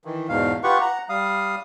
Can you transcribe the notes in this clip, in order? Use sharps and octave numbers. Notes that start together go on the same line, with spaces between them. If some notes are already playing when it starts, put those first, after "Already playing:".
D#3 E3
E2 G#2 B2 F5
F4 G4 B4 F#5 C#6
F#5 A#5
G3 F5 D#6